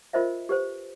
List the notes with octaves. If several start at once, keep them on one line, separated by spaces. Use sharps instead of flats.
F4 A#4 C5 D#5 E5
G4 B4 C5